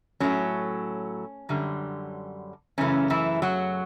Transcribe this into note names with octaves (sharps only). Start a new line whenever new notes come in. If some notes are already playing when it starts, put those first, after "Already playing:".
A2 F#3 A3 C#4
F#2 D3 G3
F#2 C#3 E3 A3 C#4
E3 E4
F#3 F#4